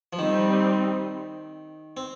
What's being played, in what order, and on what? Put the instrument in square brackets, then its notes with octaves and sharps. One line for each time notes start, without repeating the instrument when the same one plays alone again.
[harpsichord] F3
[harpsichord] D#3 [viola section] G3 C4 D#4
[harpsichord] C4